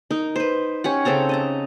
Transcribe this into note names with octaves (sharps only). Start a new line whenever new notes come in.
D#4 A#4
B4 C5
C#4 G4 F#5
C#3 C4 A4 A#5
D#5 A5 A#5